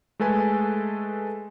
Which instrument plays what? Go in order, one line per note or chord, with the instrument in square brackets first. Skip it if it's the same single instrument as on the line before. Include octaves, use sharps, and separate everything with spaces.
[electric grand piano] G#3 A3 A4 B4 G#5